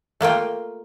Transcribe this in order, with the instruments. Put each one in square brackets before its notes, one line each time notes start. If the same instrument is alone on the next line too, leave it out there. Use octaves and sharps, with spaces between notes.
[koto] A3 A#3 F4 G5